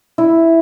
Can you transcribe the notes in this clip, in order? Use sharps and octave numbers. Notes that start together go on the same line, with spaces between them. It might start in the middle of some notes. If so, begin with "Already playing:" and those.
E4